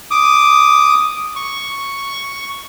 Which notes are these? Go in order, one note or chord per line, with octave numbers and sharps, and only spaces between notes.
D6 D#6
C#6